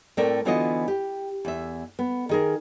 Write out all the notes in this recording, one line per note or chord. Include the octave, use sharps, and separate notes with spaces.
A2 A3 C4 A4 A#4 D5
D3 E3 B3 F4 F#4 D#5
G4
E2 E5
B3
D#3 G#4 A#4